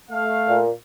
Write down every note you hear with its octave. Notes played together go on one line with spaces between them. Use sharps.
A3 F5
A#2